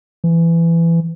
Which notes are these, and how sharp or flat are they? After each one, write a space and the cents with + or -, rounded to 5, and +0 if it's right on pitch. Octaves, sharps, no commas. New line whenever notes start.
E3 +20